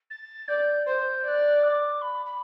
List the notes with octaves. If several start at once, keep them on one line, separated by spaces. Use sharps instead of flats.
A6
D5 G6
C5 G6
D5 F#6 G6
D6
B5
B5